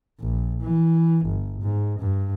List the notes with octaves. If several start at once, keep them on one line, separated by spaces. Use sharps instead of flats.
A#1
E3
G1
G#2
G2